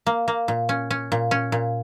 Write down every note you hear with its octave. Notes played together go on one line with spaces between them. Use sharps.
A#3
A#3
A#2
C#4
C#4
A#2
C#4
A#2